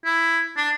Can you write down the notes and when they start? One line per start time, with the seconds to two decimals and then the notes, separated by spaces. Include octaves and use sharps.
0.05 E4
0.57 D4